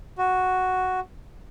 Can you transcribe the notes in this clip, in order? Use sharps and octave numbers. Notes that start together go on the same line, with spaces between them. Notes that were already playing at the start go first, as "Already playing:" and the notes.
F#4